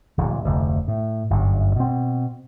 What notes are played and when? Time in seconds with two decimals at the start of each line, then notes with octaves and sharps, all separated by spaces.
0.18 D1 A#2 F3
0.45 F1 D2
0.88 A2
1.30 G1 F#2
1.76 B2 C4